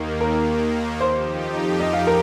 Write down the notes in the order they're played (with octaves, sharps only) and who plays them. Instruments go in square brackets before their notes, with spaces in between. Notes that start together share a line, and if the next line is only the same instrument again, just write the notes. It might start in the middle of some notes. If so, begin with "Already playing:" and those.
Already playing: [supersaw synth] D#2 D#3 A#3
[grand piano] A#4
[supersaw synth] F2 F3 D#4 G4 [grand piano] C5
[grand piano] D#5
F5
A#4